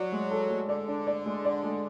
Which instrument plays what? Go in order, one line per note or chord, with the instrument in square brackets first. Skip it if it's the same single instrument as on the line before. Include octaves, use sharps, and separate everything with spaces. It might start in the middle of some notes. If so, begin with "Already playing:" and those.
Already playing: [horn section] F#3 [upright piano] D5
[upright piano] G#3
A4
G#3
[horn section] D3 [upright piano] D5
[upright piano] D4
D5
G#3
D5
G#3